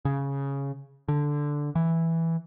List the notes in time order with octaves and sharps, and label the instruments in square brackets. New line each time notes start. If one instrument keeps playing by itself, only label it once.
[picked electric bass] C#3
D3
E3